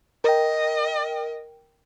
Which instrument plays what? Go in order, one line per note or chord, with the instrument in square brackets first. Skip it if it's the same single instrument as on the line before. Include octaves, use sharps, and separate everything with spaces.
[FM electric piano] A#4 G5 [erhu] D#5